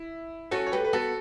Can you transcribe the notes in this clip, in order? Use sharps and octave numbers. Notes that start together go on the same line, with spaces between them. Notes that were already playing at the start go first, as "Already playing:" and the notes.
Already playing: E4
C#4 F#4 A4
C#5
A3 G4 B4
B4
B3 F#4 A4